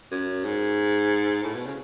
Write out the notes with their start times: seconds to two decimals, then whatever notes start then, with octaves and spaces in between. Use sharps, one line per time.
0.11 F#2
0.44 G#2
1.43 A2
1.54 B2
1.66 C#3